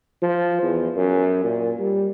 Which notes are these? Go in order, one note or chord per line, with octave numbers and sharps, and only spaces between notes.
F3
E2
F#2
A#2
G3